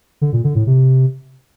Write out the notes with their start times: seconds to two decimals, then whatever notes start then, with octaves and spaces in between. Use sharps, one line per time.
0.21 D3
0.33 A#2
0.44 D3
0.55 A2
0.67 C3